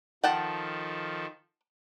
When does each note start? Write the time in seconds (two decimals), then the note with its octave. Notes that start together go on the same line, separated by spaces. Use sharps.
0.24 D#3 F3 A4 F#5 G5 A5